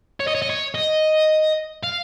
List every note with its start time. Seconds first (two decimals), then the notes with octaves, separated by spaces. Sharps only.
0.20 C#5
0.27 D#5
0.35 C#5
0.42 D#5
0.50 C#5
0.75 D#5
1.84 F5